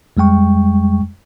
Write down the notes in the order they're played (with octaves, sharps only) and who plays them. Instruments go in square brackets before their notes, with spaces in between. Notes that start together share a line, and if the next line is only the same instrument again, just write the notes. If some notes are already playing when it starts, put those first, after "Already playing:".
[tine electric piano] F2 G3 G#3 G5 C#6